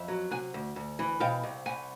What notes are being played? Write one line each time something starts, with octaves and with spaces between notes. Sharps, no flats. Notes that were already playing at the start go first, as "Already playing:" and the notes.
Already playing: F2 E5
F#3
C3 F#5 G#5
D2
D2
E3
B2 F5 G5
C2
C2 F#5 G#5